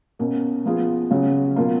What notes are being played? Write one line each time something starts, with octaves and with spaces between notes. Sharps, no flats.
B2 A#3 C#4
F3 B3 F4 G#4
C#3 F#3 C#4
B2 A#3 F4